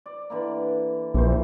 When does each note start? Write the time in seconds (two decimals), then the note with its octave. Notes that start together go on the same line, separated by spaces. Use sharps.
0.06 D5
0.30 D3 E3 A#3
1.14 A#1 E3 C5